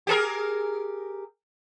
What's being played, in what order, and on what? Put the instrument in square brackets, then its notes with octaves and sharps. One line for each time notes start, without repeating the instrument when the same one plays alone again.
[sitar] G4 G#4 A#4